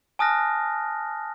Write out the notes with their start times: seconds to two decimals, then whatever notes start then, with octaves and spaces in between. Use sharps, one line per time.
0.19 G#5 A5 D#6 F6 F#6 A#6